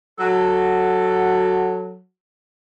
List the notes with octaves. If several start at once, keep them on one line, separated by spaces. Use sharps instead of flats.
F#3 F#4 A4